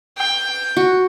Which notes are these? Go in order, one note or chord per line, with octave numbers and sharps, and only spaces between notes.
G5
F#4